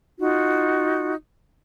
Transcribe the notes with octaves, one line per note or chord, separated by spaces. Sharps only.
D#4 F4 F#4